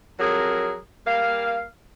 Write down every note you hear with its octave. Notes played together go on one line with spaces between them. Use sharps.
F2 F#3 G#4 A#4
G3 A#3 F5